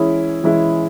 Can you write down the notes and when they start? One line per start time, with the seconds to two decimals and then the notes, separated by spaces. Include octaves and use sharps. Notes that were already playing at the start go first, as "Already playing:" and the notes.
Already playing: E3 G#3 C#4 E4 G#4
0.44 E3 G#3 C#4 E4 G#4